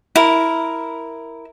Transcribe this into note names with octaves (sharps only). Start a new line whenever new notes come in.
E4 A#4